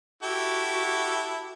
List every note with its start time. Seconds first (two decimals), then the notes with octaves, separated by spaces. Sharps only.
0.23 E4 F#4 G4 A4